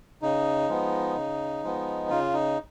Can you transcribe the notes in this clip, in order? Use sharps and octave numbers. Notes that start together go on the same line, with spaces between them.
C#3 D#4
F3 G#3 B3
C#3
F3 G#3 B3
C#3 F4
D#4